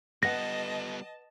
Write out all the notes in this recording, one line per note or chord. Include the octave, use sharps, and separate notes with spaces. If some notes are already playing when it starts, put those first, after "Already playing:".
G3 B3 B4 D#5 F#5 A5 A#6